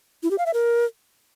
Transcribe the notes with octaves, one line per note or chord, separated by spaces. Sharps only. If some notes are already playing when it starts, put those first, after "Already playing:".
E4
G4
F5
E5
A#4